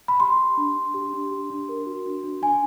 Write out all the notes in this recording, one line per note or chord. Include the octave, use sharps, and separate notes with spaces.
B5
G4 C6
G4
D4
D4
G4
D4
G4
D4
A#4
F#4
D4
D4
D4 G#5